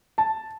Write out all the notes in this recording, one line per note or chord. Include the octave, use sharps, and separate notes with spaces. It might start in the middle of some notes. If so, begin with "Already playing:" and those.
A5